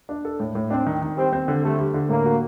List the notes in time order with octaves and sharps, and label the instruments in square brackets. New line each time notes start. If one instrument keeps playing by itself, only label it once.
[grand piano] D4
A4
A2
A2
[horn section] C4 [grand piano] D4
[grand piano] D#3
D#3
[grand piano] G3 [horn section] C4
[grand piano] C4
D3
[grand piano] G3 [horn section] A3
[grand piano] G3
D3
[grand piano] A2 [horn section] A#3
[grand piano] F#4